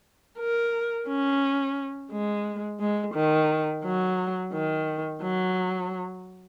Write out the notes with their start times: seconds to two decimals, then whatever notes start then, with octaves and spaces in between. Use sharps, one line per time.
0.39 A#4
1.08 C#4
2.11 G#3
2.80 G#3
3.15 D#3
3.84 F#3
4.53 D#3
5.22 F#3